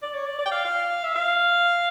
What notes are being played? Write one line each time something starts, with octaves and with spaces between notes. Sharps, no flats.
D5
C#5
D5
D5
G5
F5
F5
E5
F5